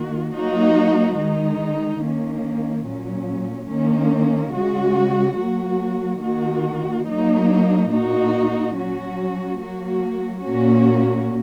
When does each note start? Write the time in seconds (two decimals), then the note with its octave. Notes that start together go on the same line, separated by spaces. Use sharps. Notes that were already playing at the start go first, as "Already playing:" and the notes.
Already playing: D#3 A#3 F#4
0.32 F#3 A#3 D#4 F#4
1.17 D#3 G#3 D#4
2.01 D#3 A#3 C#4
2.86 A#2 F#3 C#4
3.70 D#3 A#3 C#4
4.54 C#3 G#3 F#4
5.38 F#3 A#3 F#4
6.23 D#3 A#3 F#4
7.07 F#3 A#3 D#4
7.91 A#2 A#3 D#4 F#4
8.75 F#3 C#4 F#4
9.60 F#3 A#3 F#4
10.43 A#2 A#3 C#4 F#4